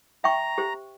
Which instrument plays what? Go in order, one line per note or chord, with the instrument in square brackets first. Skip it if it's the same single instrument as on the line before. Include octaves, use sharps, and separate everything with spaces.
[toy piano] E5 G5 C#6 [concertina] A#5
[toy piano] G4 C5